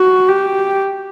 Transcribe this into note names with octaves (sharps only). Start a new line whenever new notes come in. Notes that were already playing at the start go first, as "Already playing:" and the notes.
Already playing: F#4
G4